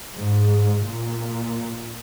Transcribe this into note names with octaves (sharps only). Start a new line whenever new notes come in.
G#2
A#2